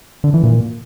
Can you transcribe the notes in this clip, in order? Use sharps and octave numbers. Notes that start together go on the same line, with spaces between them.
D3
E3
A#2